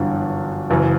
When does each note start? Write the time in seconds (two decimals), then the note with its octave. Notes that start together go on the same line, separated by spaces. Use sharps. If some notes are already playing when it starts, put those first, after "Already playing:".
Already playing: G1 F#2 E3 D4
0.70 F#1 F#2 E3